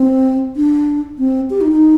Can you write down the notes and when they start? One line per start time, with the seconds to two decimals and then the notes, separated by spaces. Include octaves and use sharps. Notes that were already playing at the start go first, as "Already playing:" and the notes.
Already playing: C4
0.56 D4
1.19 C4
1.50 G4
1.61 D#4
1.71 D#4